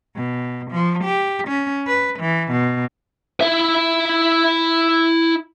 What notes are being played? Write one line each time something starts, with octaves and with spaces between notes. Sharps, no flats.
B2
F3
G4
C#4
B4
E3
B2
E4 E5